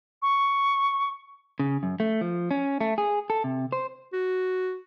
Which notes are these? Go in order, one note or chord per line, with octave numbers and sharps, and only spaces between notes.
C#6
C#3
F#2
A3
F3
C#4
A3
G#4
A4
C3
C5
F#4